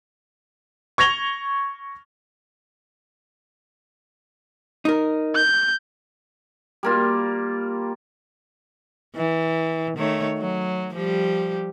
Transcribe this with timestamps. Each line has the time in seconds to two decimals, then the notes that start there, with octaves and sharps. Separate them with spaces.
0.98 C#6 G#6 A#6 F7 G7
4.85 D#4 A#4
5.35 G6
6.83 G3 A#3 F4
9.15 E3
9.97 D#3 A3 C#5
10.39 F#3
10.95 F3 G3 G4